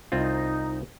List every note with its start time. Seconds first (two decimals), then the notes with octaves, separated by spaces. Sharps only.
0.12 C2 C4 D#4 F4